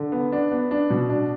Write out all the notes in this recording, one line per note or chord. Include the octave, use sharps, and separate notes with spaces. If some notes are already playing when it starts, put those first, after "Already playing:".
Already playing: D3
B3
D4
B3
D4
B2
D4